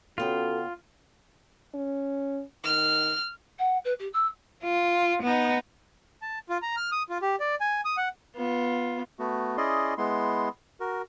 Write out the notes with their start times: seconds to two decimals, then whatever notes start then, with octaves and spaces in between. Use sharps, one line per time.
0.18 C#3 B3 C#4 F4 F#4 A4 G5
1.74 C#4
2.64 D#3 F6
3.58 F#5
3.84 B4
3.99 G4
4.13 E6
4.63 F4
5.23 B3 D#4
6.22 A5
6.49 F4
6.62 A#5
6.77 F6
6.92 D#6
7.09 F4
7.22 G4
7.40 D5
7.61 G#5
7.85 D#6
7.97 F#5
8.36 B3 F4
9.19 A3 B3 F#4
9.57 C#4 E4 G#4 D5 D#5 C6
9.98 G#3 B3 E4 C6
10.80 F#4 A#4